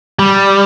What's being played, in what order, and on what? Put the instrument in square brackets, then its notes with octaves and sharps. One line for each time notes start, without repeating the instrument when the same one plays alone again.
[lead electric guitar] G3